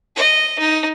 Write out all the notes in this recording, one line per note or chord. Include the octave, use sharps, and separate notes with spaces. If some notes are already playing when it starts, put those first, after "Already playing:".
D#5
D#4